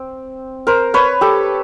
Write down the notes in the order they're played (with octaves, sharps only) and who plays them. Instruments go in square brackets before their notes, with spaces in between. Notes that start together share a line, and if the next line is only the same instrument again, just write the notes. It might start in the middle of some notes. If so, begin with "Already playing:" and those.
Already playing: [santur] C4
A#4 C5
B4 C#5
G4 A4